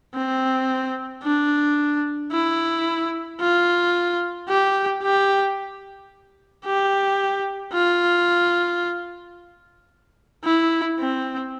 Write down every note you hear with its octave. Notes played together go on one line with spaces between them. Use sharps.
C4
D4
E4
F4
G4
G4
G4
F4
E4
C4